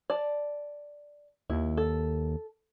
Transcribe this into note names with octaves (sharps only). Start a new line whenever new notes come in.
D5 A5
D#2 E4
A4